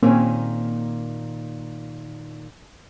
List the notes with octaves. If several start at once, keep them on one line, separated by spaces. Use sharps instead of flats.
A#2 D#3 A#3 C4 C#4